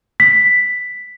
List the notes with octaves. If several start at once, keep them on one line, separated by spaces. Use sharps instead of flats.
B6